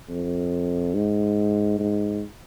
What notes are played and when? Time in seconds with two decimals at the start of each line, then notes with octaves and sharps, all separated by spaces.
0.09 F2
0.94 G#2
1.79 G#2